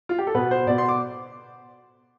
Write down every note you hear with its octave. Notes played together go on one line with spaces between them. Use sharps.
F4
G4
A4
B2 B3 B4
C5
B2 B3 D5
C6
D6